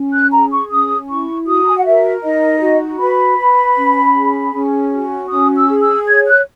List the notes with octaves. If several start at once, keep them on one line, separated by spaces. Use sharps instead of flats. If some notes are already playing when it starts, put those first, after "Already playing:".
Already playing: C#4
F#6
G#4 A#5
C#6
C#4 D#6
E4 C#6
F#4 D#6
A#5
G#5
F#5
A#4 E5
D#4 D#5
F#4
B4 B5
B4
C#4
G#4
C#4
F#4
C#4 D#6
E6
G#4
E6
C#5 G#6
F#6